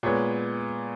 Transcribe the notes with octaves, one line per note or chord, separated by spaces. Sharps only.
A#2 G#3 B3 C#5